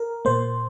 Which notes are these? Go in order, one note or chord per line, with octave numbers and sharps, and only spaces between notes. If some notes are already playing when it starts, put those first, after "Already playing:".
Already playing: A#4
A#2 A#3 C5